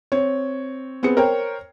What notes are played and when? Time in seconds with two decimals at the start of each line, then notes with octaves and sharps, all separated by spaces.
0.12 C4 C#5
1.03 B3 C4 G#4 C#7
1.17 A#4 C5 C#5 G5